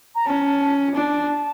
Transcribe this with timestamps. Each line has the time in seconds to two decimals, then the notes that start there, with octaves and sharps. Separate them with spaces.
0.15 A#5
0.27 C#4 A5
0.95 D4 A5